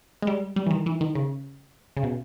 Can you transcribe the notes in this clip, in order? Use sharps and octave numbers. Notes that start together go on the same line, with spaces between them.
G#3
G3
G3
E3
D#3
E3
D#3
C#3
C#3
B2